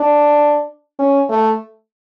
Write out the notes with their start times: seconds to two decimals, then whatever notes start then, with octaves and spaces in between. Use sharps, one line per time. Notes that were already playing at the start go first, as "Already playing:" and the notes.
Already playing: D4
0.99 C#4
1.30 A3